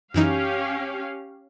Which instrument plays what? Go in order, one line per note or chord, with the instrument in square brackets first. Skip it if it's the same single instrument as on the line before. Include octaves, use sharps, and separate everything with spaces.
[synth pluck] F#2 E3 D#4 [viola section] C#4 G4 F5